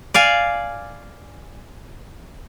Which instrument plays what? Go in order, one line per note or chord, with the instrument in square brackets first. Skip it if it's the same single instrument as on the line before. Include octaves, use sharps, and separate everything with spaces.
[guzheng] D5 F5 G#5